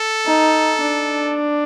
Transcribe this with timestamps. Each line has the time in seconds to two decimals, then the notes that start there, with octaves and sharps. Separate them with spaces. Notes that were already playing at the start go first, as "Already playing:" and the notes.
Already playing: A4
0.26 D#4
0.82 D4